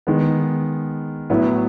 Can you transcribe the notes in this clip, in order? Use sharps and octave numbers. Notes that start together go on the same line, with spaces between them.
D#3 G#3 B3
A2 F#3 B3 E4